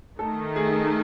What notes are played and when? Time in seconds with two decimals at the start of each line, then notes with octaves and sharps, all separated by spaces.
0.19 D#3 A3 D#4 A4
0.56 G#4